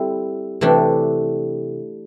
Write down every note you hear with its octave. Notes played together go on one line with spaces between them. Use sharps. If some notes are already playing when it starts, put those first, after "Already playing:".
Already playing: G3 C4 E4 A4
C3 E3 A3 D4 G4